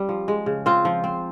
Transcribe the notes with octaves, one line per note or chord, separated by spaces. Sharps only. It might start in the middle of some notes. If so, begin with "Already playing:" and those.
Already playing: G3 C#4
F3
G#3
C#3
C4 F4
F3
C4